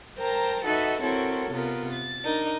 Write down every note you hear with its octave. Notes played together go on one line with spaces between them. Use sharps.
A#4 C5 G5 A5 A#5
D#4 F#4 A4 B4 D#5 E5
C4 E4 F#4 A4 A#4 C#5
C3 B3 F4 A#4
A6
D4 D#4 A#4